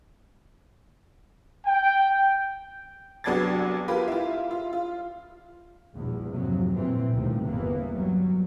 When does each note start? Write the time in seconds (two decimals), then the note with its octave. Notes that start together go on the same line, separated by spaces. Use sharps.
1.66 G5
3.24 C2 F#3 B3 D4 G#6 A6
3.88 F4 G4 A#4 B4
4.08 E4 F4
4.51 F4
4.73 F4
5.94 A#1 E2 G2 B2
6.33 F2 G#2 C3 F#3
6.72 G1 A#2 E3 C4
7.14 D2 A2 C3 D#3 F3 G3
7.45 G1 E2 E3 A#3 B3
7.94 F#3 G3